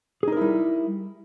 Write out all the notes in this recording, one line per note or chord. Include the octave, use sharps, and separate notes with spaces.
G3 D#4 E4 G#4 A#4